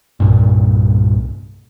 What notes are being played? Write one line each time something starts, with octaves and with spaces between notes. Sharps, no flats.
C2 G2 A#2